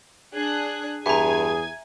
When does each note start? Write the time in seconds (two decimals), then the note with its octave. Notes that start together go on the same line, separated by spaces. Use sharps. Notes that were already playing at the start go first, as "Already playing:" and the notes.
0.33 D4 G#4 F#6
1.06 E2 G2 G#4 E5 G#5 A#5 G#6